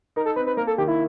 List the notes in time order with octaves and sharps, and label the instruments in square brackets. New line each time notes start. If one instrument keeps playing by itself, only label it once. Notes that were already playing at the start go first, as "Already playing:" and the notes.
[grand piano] D#4 [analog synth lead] A#4
[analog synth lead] A4
[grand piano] C4 [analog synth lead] B4
[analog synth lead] B4
[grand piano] A#3 [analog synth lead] A#4
[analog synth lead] A4
[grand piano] D#3 [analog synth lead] G4
[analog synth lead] E4